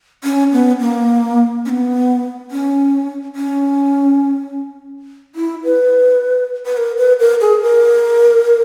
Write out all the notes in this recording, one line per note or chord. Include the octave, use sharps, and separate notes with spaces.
C#4
B3
A#3
C#4
B3
C#4
C#4
E4
B4
B4
A#4
B4
A#4
G#4
A#4